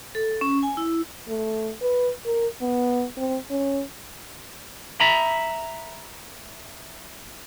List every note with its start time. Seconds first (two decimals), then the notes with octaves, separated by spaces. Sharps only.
0.15 A4
0.41 C#4
0.63 G#5
0.77 E4
1.28 A3
1.82 B4
2.25 A#4
2.61 B3
3.17 C4
3.50 C#4
5.00 E5 A#5 B5